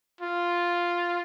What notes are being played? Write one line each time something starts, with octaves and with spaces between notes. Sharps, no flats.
F4